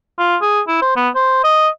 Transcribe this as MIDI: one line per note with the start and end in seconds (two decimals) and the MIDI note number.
0.18 0.36 65
0.41 0.61 68
0.67 0.78 64
0.82 0.93 72
0.96 1.09 59
1.15 1.40 72
1.44 1.69 75